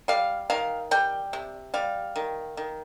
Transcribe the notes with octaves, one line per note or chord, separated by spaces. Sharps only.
G3 F5
D#3 F5
G3 G5
C3
G3 F5
D#3
D#3